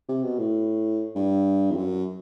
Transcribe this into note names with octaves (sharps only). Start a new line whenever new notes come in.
C3
B2
A2
G2
E2
F#2